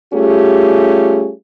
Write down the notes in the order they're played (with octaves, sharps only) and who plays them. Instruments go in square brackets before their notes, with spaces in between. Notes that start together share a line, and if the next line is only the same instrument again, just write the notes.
[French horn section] G3 A3 C#4 F4 G4 G#4